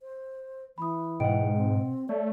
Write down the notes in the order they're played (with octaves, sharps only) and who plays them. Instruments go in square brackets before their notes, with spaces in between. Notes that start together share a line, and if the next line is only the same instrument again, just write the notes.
[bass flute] C5
[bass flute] E3 [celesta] B5 D#6
[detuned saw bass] G#2 [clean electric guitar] B2 F#5 [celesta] D#5 G5 D7
[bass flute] C4
[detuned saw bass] A3 [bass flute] C#5 [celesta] D5